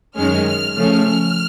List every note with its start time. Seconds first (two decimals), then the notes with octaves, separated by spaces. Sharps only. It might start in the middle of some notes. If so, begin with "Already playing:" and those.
0.16 F#2 D#3 G#3 C#4 F6
0.46 F6
0.75 C#3 F3 A3 C#4 F6